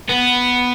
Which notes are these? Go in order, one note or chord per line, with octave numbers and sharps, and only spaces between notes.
B3